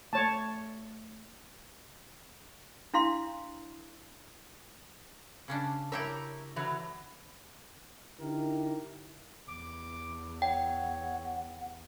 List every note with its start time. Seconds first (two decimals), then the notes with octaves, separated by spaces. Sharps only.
0.13 A3 C#5 D5 A5
2.94 D4 E4 F5 C6
5.48 C#3 C#4 D4
5.92 E4 G4 A#4 C#5 E5
6.56 D3 E3 F#3
8.20 D3 D#4 E4 G4 A#4
9.48 E2 D6
10.42 C#5 F#5 G5